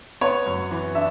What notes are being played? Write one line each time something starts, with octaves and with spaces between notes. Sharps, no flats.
B3 C#5
F#2
E3
D4 E5